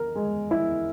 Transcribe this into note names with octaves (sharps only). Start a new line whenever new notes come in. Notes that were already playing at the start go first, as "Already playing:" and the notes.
Already playing: A#4
G#3
E4